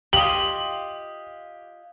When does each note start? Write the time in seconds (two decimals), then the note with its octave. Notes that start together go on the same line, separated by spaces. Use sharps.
0.13 F4 G4 D#5 F#7